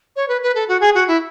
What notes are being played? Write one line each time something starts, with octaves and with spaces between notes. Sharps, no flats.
C#5
B4
B4
A4
F#4
G#4
F#4
E4